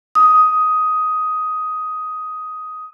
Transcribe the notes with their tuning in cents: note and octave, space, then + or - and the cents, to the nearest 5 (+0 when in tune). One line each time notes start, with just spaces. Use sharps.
D#6 +10